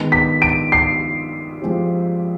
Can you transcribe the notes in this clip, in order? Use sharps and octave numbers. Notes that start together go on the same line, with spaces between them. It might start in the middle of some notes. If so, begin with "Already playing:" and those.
Already playing: D#3 G#3 B3
B6
D7
C7
F3 G#3 C4 G4